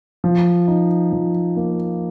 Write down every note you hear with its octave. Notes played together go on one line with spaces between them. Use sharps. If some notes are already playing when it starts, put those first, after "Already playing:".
F3
D#4
F3
A#3